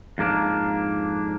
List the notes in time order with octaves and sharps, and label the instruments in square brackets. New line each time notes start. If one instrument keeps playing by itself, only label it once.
[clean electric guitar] F2 G#2 A#3 D4